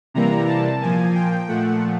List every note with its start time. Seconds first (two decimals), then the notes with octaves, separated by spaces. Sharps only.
0.14 C3 E3 G3 A#3 A#5
0.48 A5
0.81 A#2 F3 A#3 G#5
1.15 G5
1.48 A#2 F3 A3 F#5